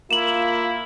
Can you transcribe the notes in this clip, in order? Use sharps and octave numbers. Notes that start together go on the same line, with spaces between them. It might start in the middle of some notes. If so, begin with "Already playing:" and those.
A#3 E4 F4 E7 F#7